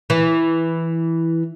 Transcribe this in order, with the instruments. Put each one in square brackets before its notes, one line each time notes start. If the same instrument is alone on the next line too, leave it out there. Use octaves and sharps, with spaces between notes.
[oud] E3